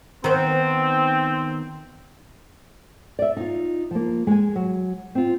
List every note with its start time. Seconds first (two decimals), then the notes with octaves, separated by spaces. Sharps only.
0.24 D#3 B3 C4 C5
3.19 D5 E5
3.37 D#4 F4
3.91 F3 A#3
4.27 G#3 G#5
4.56 F#3
5.15 C4 F4